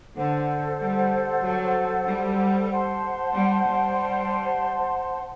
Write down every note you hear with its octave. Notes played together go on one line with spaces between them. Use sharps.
D3 A4 C5 F#5
G3
F#3
G3
C5 F#5 A5 C6
G3
G3